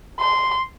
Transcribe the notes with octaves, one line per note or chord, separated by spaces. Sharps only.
C6